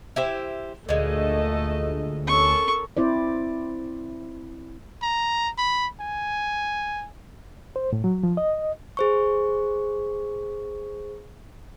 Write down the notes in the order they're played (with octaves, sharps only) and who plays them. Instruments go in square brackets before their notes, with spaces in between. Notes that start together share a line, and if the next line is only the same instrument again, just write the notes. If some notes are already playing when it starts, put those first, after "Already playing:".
[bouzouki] E4 G4 C5
[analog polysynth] D2 [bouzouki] A#2 G#3 [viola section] A3 A4 D#5
[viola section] C#4 A4 A#4 [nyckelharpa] C#6
[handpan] C4 E4 C5 D5
[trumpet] A#5
B5
G#5
[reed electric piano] C5
A2
F#3
F3
D#5
[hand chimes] G#4 C5 C#6